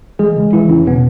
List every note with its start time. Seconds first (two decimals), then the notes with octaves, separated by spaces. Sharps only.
0.19 E3 G#3 G#4
0.36 C#3
0.53 C#3 E3 E4
0.70 E2 C#3 C#4
0.86 B2 B3